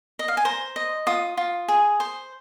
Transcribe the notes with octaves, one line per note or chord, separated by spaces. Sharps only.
D#5
F5
G#5
C5 A#5
D#5
F4 D#6
F4
G#4
C5